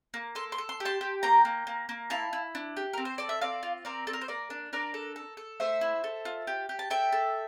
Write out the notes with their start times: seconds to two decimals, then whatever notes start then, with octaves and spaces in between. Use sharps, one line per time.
0.14 A#3
0.35 A4 C6
0.52 C6
0.58 A4
0.69 C6
0.80 G4
0.85 A5 C6
1.01 G4
1.23 A#3 G5 A#5
1.45 A#3
1.67 A#3
1.89 A#3
2.10 E4 F5 A5
2.33 E4
2.55 D4
2.77 G4
2.93 C4 A#4
3.05 C5
3.18 A4 D5
3.29 E5
3.41 C4 D5 F5
3.63 F4
3.85 C4 A#4 D5
4.07 C4 A4
4.13 A#4
4.21 C5
4.28 A#3 A#4 D5
4.50 D4
4.73 D4 A#4 D5
4.94 A4
5.16 A4
5.37 A4
5.60 A3 C5 E5
5.81 E4
6.04 A4
6.25 F4
6.47 G4
6.69 G4
6.79 A5
6.90 A4 E5 G5
7.12 A4